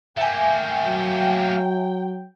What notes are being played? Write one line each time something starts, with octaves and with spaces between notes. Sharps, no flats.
A3 A#3 E5 G5 G#5
F#3